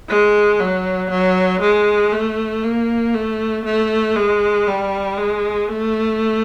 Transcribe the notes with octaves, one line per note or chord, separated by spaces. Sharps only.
G#3
F#3
F#3
G#3
A3
A#3
A3
A3
G#3
G3
G#3
A3